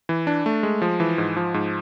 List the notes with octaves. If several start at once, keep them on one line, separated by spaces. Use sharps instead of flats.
E3
D4
A3
G#3
F3
E3
G#2
F3
G#2